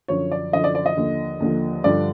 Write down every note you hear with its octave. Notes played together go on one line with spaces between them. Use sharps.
F#2 D3 F3 C#5
D5
F#2 D3 F3 D#5
D5
D5
D#5
D#2 D3 F3
D#2 D3 F3
G2 D3 F3 D5